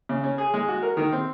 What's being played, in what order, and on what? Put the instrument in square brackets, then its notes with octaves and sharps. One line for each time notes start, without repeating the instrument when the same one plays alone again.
[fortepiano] C#3
C#4
G#4
G#3
F#4
A#4
D#3
C4